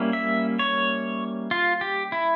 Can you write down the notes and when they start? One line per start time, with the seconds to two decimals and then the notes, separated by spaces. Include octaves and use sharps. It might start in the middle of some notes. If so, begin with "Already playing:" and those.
Already playing: G3 A#3 C#4 E4
0.13 E5
0.59 C#5
1.51 F4
1.81 G4
2.12 E4